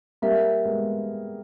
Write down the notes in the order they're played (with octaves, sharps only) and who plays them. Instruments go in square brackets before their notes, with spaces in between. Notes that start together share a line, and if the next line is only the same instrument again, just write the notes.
[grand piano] G3 A#3 [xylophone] G4 A#4 E5
[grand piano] G#3 B3